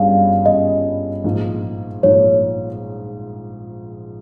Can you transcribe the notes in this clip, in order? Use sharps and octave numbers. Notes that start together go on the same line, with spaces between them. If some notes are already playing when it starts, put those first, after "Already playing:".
Already playing: G1 G2 G3 C#4 G#4 F5
G1 G2 G3 C#4 G#4 D#5
A#1 G#2 F3 A#3
A#1 G#2 F3 A#3 C#5